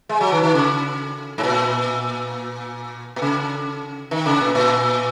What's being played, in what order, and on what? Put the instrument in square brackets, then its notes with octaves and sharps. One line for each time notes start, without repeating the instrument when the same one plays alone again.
[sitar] G#3
F#3
D#3
D#3
C#3
G#2
A#2
A#2
C#3
D#3
C#3
A#2
A#2